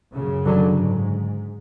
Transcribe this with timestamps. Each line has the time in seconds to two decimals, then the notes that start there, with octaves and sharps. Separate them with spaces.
0.14 F#2 C#3
0.45 D3 F#3
0.76 G#2